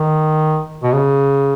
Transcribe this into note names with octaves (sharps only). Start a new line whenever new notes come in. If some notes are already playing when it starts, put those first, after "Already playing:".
Already playing: D#3
B2
C#3